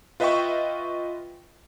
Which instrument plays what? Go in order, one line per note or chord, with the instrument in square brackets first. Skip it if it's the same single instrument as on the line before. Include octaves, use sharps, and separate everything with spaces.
[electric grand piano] F4 B4 D#5 E5 G5 C#6